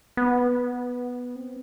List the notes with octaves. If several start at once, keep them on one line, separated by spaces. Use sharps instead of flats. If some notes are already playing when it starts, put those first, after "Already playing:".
B3
C4